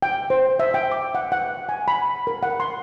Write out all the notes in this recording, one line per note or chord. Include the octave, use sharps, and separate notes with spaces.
G5
C5
E5
G5
D6
F#5
F#5
G#5
B5
A#4
F#5
C6